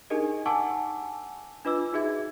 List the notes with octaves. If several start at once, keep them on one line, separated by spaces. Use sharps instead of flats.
D4 D#4 G4 G#4 A#4 D#5
F#5 G#5 A5 C#6 D6 E6
D4 F4 B4 D#5 D6 E6
D#4 F#4 G#4 E5 G#6